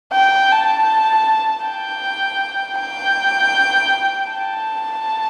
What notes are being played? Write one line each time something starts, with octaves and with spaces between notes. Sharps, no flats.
G5
A5
G5
G5
A5